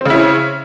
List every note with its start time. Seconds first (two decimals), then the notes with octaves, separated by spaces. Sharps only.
0.01 C4
0.05 C#3
0.10 E4
0.15 C#4